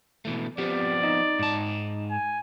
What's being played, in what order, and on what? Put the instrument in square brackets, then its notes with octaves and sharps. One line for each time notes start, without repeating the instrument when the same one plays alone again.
[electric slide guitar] B2 E3 A3
[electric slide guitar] F3 B3 C4 [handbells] G4 [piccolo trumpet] D5
[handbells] D#4 D#5
[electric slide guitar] G#2 A5
[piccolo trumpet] G#5